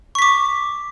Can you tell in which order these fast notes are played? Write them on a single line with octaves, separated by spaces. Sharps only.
C#6 B6 D6